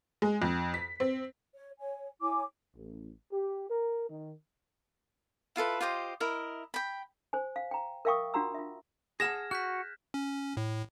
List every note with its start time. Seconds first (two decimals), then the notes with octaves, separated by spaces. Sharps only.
0.22 G#3
0.42 F2
0.74 B6
1.00 C4
1.53 C#5
1.78 C#5 G#5
2.21 E4 C#5 G#5 D6
2.75 A1
3.32 G4
3.70 A#4
4.10 D#3
5.56 E4 F4 A4 B4
5.81 F4 G4 C5 D#5
6.20 E4 A#4 D#5
6.74 G5 B5
7.33 C5 G#5
7.56 F5
7.71 G5 A#5
8.05 A#4 E5 F5 G5 C#6 D#6
8.34 D4 F4 F#4 F#5 A#5 E6
8.54 F4 E5
9.20 G#4 F#5 A5 F6 G#6 A#6 E7
9.51 F#4 F#6 G6 B6
10.14 C#4
10.57 A2